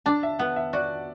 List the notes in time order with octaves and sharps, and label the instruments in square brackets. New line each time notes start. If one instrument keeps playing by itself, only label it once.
[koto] D4 [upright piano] A5
[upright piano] E5
[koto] B3 [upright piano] F#5
[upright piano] E5
[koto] F#4 [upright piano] D5